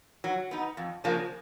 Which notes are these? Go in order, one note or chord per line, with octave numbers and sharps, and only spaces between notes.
F#3
B3 D#4
F2
C#3 F3 A#3 D4